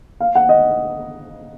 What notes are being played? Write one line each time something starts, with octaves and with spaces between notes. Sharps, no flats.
F5
F#5
D#5